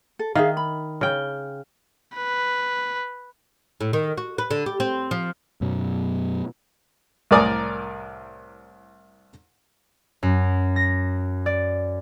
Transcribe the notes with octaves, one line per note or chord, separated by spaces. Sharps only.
A4
D#3 G#4 E5 F5
B5
C#3 G5
B4
A2
D#3
F#4
B4
D3
G4
C4
F3
F#2 B2 F#3
C2 A2 A#4 D5 G#5 D#6
F#2
A#6
D5